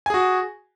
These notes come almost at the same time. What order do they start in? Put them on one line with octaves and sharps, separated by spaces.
G#5 G#4 F#4